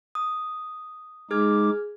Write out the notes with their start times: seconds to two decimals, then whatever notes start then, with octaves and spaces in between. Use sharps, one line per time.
0.15 D#6
1.31 G#3 D#4 G#4 D6 F6 G#6